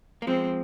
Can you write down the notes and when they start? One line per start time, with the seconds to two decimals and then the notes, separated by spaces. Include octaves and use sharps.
0.22 A#3
0.27 F3 G#3 C4